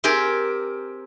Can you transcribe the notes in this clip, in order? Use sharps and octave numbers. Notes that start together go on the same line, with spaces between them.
C4 G4 G#4 A#4